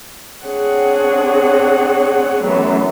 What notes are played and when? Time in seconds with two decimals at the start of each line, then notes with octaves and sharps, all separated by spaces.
0.43 C4 D4 G#4 C#5 F#5
2.42 F#2 E3 F#3 A3 B3